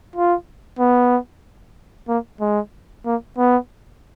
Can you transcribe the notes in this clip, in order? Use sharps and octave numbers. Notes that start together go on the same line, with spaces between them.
F4
B3
A#3
G#3
A#3
B3